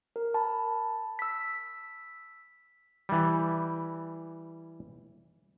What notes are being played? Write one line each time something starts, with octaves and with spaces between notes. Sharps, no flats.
A#4
A5 B5
E6 B6
E3 G3